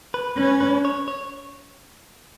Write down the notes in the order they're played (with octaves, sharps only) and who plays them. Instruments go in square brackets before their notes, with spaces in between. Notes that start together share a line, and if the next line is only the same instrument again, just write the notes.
[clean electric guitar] B4
[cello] C#4 [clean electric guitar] B4
[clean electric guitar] B4
C#5
C#5